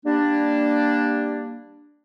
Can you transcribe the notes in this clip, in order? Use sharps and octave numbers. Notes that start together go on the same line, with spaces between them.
G3 A#3 D4